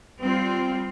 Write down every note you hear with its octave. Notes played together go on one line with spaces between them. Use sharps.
G3 C4 F4